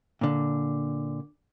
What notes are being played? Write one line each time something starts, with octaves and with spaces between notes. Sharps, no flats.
A#2 D3